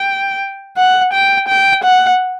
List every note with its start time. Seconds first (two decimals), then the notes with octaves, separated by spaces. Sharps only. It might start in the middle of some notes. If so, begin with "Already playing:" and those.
Already playing: G5
0.77 F#5
1.13 G5
1.48 G5
1.84 F#5